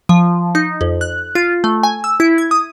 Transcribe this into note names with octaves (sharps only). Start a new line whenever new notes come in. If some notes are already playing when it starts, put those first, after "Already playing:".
F3
D#4
F2
F#6
F4
A3
G#5
E6
E4
G#6
D#6